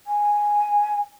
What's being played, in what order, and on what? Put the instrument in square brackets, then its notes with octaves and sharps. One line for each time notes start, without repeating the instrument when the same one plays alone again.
[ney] G#5